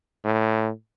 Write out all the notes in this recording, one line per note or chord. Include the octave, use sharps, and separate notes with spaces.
A2